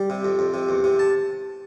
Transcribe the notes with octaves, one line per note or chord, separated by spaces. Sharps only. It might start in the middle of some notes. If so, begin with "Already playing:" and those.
Already playing: G3
C3
F2
F2
C3
E2
C3
A5